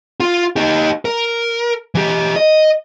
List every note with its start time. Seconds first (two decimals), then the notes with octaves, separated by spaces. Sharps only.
0.20 F4
0.56 D#4 G4
1.05 A#4
1.95 E3 G4
2.36 D#5